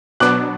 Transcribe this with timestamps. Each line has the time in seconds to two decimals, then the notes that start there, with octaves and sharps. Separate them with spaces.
0.20 B2 F#3 B3 D4 D6 F#6